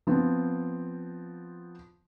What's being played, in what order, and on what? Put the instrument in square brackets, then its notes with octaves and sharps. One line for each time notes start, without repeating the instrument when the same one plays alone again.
[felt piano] F3 B3 C4